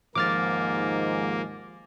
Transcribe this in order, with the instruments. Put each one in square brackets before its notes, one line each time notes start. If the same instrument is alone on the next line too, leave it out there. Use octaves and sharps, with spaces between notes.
[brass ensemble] D#2 G#2 [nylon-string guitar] D#3 F3 [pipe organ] A#3 [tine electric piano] D6 F6 A6